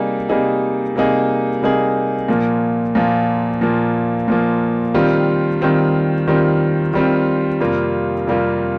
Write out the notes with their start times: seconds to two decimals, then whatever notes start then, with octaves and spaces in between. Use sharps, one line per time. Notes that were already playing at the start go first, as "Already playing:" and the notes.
Already playing: C3 G3 A#3 D#4 G#4
0.29 C3 G3 A#3 D#4 G#4
0.96 C3 G3 A#3 D#4 G#4
1.62 C3 G3 A#3 D#4 G#4
2.28 A#2 F3 A#3
2.95 A#2 F3 A#3
3.61 A#2 F3 A#3
4.28 A#2 F3 A#3
4.94 D#3 G3 C4 F4
5.61 D#3 G3 C4 F4
6.28 D#3 G3 C4 F4
6.94 D#3 G3 C4 F4
7.60 F2 C3 G3 A#3 F4
8.27 F2 C3 G3 A#3 F4